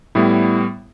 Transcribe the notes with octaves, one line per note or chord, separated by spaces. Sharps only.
A2 G3 B3 E4